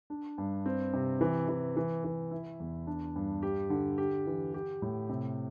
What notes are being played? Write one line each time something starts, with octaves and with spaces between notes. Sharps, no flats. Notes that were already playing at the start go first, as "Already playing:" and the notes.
D4
G2
C4
C3
E3
E3
E3
E3
E4
E2
D4
G2
G4
D3
G4
E3
G4
A2
C3